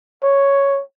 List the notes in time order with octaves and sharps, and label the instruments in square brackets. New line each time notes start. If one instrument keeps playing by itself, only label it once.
[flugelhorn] C#5